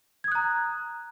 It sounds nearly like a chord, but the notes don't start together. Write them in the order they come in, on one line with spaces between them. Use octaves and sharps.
G#6 D#6 F#6 A#5